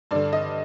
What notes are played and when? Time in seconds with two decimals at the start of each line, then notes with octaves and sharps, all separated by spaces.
0.11 G2 D3 D5
0.33 D#5